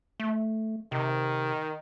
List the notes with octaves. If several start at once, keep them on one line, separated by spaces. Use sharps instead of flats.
A3
C3 D#3